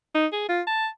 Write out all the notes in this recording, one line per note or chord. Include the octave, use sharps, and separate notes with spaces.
D#4
G#4
F4
A5